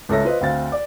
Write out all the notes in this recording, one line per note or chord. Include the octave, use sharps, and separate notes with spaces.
C#2 A4 C#5 E5 A#6
F4 B4 C5 D#5
D2 C4 F5 A6
D5